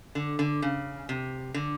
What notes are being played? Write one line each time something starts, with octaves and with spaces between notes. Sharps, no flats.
D3
D3
C#3
C3
D3